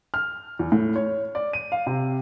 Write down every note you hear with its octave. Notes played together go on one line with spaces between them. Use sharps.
F6
E2
A2
C#5
D5
D#7
F5
C3